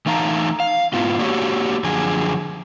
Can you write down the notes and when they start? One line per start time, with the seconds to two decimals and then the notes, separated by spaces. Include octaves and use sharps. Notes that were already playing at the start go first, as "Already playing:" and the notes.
0.06 E3 A3 D#4 F5 A5 A#5
0.60 F5
0.93 G#2 B3 E4 F4
1.19 A#3 D4 F#4 G4 B4 C#5
1.84 F#2 D3 F3 G#4 G#5